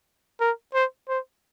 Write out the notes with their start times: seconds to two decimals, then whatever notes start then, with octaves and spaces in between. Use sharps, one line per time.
0.40 A#4
0.74 C5
1.09 C5